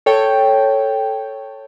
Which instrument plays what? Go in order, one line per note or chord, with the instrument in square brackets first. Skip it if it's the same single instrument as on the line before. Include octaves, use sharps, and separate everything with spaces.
[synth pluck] A4 C#5 G5